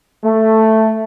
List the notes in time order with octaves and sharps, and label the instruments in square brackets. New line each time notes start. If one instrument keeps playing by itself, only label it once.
[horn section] A3